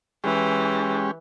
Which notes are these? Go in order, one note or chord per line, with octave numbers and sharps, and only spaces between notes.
E3 G#3 C#4 G4